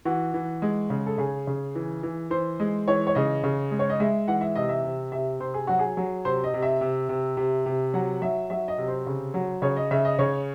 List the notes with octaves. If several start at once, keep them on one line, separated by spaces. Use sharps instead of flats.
E3 F#4
E3
G#3
C#3
A4
C#3 G#4
C#3
E3
E3
E3 C5
G#3
E3 C#5
C#5
C#3 D#5
C#3
G#3
C#5
D#5
G#3 E5
E3 F#5
E5
C3 D#5
E5
C3
C3 E5
C3 C5
G#4
F#3 F#4
G#4
F#3
C3 C5
D#5
C3
E5
C3
C3
C3
C3
F#3 F#5
F#3 E5
F#3 E5
D#5
C3
C5
C#3
F#3
C#3 C#5
D#5
C#3 E5
D#5
C#3 C#5